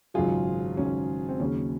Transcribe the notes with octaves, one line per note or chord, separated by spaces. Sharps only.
G#1 F#2 C#3 F#3 F4 G#4
G#1 F#2 C#3 F#3 C#4
C4
D#2 C#3 F#3 C#4